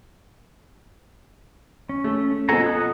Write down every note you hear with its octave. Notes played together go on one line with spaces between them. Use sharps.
C#4
A3
B2 F3 A4 F#5 G#5 A#5
D#5 F#5